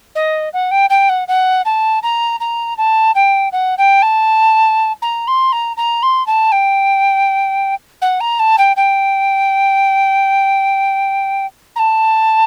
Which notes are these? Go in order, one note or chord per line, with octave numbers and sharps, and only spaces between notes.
D#5
F#5
G5
G5
F#5
F#5
A5
A#5
A#5
A5
G5
F#5
G5
A5
A#5
C6
A#5
A#5
C6
A5
G5
F#5
A#5
A5
G5
G5
A#5
A5